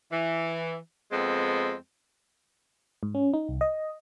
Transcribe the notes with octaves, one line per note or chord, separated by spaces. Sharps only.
E3
F2 G#3 B3 C4
G#2
C#4
D#4
C2
D#5